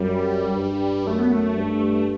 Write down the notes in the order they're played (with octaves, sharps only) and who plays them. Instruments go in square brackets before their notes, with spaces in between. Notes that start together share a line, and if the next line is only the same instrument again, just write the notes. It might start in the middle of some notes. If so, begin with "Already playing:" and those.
Already playing: [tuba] F#2 [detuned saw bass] G3
[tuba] G2
[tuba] F#2 [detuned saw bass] A3
[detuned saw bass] B3
A3
[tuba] G2